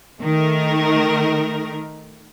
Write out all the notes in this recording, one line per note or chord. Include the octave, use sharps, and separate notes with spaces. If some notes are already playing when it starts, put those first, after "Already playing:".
D#3 A3 A#4